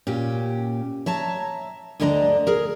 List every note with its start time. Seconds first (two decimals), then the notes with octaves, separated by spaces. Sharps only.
0.07 A#2 C#4 G4
1.06 C#5 E5 A5 A#5
2.00 D2 G2 D3 D4 D#5 A#5
2.47 G#4 A#4